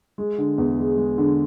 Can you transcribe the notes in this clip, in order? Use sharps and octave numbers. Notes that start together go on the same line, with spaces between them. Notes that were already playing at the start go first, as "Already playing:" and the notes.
G#3
D3
E2
G#3
G#3
D3